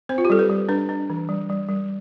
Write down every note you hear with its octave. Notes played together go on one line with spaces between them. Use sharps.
C4 C5
F4
G4
G3 A4
B4
G3
D4 B4
D4
E3
G3
G3
G3